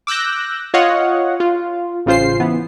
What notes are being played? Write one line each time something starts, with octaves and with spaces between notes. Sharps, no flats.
D6 E6 F#6 G6 A#6
F4 C#5 D#5 F5 F#5
F4
A1 C#3 F4 C5 C7
E3 B3